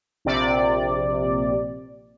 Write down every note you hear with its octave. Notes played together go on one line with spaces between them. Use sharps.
A#1 C3 D5